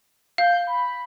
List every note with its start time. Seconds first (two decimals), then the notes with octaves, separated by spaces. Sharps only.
0.38 F5 G6
0.67 B5